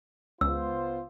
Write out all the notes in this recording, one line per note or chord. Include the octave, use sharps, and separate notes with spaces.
C#2 B3 F4 C5 E6